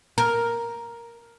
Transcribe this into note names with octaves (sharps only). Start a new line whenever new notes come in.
A#4